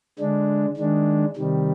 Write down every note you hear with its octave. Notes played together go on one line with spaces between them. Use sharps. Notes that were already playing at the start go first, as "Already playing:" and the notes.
D3 G#3 D4
D#3 G#3 D4
C3 D#3 G3